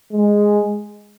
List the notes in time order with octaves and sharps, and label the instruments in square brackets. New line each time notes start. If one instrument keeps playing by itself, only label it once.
[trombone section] G#3